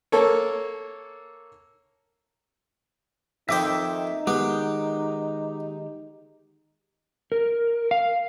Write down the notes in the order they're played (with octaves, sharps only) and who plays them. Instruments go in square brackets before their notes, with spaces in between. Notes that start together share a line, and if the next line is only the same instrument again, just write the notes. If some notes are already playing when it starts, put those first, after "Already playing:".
[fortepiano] A#3 A4 C#5
[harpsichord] F2 D#3 C5 [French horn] D#4 [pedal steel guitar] E5 D6
[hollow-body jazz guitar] D#3 G#3 [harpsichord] B3 [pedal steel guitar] G4
[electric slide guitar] A#4
F5